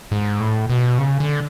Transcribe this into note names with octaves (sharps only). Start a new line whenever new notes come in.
G#2
A2
B2
C#3
D3